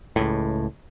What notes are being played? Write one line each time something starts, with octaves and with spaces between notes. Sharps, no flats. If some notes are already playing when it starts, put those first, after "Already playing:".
C#2 A2